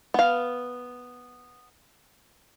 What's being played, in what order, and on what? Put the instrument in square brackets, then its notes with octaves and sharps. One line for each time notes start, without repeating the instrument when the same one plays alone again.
[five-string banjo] B3 F5